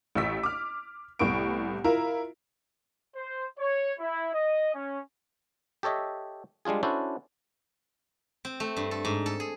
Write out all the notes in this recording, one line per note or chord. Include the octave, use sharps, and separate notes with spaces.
A1 C#6 E6 B6
D6 F6
C2 A2 B3 C#6 D7
E4 F4 A#4
C5
C#5
E4
D#5
C#4
G4 A4 C#5 D#5 E5
G3 G#3 D4 F4 G#4
C#4 D4 E4 F#4 A4 C5
C4
A3
G2
A4
G#2
A4
G#4